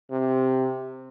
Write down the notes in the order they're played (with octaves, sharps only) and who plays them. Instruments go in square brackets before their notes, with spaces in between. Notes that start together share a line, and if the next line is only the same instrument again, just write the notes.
[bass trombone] C3